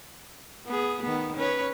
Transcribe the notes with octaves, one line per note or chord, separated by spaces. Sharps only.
B3 G#4
D#3 B3
C#4 B4 C#5